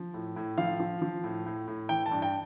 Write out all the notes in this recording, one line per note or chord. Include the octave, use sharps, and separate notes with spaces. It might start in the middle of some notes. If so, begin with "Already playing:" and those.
Already playing: F3
A2
A2
F3 F5
F3
F3
A2
A2
A2
E3 G5
A5
G2
G5